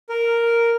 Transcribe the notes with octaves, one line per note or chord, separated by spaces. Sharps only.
A#4